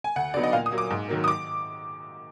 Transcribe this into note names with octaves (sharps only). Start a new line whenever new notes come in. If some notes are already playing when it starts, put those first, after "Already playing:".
G#5
D2 F#5
D3 F#3 B3 D#4 D5
D#5
A#2 F5
D#6
F#3 A#3
D6
G#2
D#3 F#3 A#3
D#6
D6